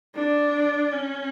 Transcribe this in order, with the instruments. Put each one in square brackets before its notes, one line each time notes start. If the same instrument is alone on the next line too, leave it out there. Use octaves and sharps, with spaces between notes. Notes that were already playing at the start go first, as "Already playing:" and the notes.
[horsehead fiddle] D4
C#4